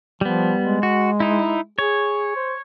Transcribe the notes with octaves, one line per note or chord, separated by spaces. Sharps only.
F3 G3 B3
G#3
F#4
D#4 E4
G#4 C#5
C5